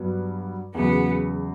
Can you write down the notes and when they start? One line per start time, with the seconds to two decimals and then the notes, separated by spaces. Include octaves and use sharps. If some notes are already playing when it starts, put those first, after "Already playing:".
Already playing: G2 F#3 B3 F#4
0.75 E2 C#3 F#3 B3